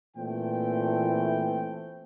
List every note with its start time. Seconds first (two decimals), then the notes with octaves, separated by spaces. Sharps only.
0.17 A#2 E3 A3 C4 G5